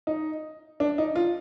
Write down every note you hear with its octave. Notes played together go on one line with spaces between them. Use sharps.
D#4
D4
D#4
F4